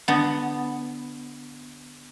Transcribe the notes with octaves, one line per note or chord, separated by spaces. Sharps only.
D3 B3